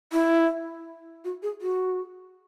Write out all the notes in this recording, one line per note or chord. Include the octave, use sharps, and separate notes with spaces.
E4
F#4
G#4
F#4